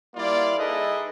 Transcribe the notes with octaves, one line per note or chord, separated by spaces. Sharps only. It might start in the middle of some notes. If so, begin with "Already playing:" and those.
G3 A#3 E4 F4 D5
D#4 G#4 A4 B4 D#5 E5